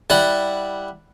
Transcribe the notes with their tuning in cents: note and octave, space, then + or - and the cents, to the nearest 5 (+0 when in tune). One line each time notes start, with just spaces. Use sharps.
G3 +0 E4 -5 F#5 +0